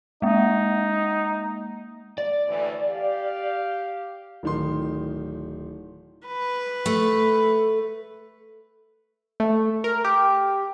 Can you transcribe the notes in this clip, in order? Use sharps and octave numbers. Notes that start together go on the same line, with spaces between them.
G#3 A#3 D#4
D5
D2 A2 E3
G4 F5
D1 D#3 C6
B4
A3
A3
A#4
G4